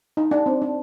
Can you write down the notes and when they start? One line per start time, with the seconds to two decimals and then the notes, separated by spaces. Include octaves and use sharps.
0.17 D#4
0.31 D4
0.46 C4
0.62 D4